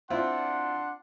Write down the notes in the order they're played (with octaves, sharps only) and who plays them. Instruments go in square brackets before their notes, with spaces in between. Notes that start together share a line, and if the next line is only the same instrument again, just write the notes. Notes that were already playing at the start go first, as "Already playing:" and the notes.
[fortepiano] C4 E4 F4 [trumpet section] D4 F#5 C6